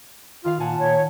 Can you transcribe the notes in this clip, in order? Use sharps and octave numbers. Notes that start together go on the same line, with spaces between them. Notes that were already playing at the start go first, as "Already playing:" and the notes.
D#3 F4 F5
A#2 F#5 G#5 A5
A#2 C#5